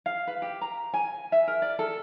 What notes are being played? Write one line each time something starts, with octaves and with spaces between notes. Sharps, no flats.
F5
B4
G4
A#5
G#5
E5
A#4
D5
A4